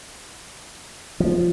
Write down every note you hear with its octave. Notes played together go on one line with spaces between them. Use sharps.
F3